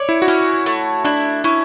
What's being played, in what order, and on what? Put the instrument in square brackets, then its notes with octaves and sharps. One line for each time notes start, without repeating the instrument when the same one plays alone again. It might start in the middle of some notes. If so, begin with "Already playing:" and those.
Already playing: [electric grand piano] C#5 [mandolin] D5
[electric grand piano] E4
F#4
[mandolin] C#4 [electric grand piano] E4
[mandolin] A3
[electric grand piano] D4 [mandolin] E4
[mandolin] C#4 [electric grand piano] E4